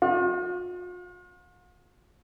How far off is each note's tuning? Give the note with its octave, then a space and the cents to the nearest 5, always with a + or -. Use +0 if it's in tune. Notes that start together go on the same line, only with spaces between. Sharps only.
F4 +45